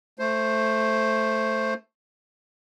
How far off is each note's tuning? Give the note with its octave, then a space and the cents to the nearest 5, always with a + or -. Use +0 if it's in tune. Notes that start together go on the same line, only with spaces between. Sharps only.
A3 +0 C5 +5